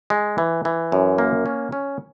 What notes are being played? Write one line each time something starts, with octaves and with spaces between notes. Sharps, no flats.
G#3
E3
E3
F#2
A#3
C#4
C#4